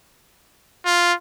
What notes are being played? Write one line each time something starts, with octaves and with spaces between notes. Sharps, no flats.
F4